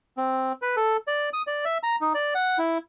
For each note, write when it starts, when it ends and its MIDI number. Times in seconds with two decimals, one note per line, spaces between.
0.17 0.52 60
0.62 0.76 71
0.77 0.97 69
1.08 1.29 74
1.33 1.42 87
1.47 1.65 74
1.65 1.78 76
1.83 1.96 82
2.01 2.13 63
2.15 2.34 74
2.35 2.58 78
2.58 2.78 64